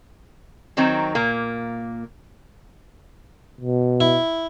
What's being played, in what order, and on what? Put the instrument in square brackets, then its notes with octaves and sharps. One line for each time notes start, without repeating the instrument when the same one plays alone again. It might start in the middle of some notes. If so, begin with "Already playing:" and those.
[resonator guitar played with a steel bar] D#3 F#3 C4 D#4
A#2 A#3
[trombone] B2
[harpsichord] E4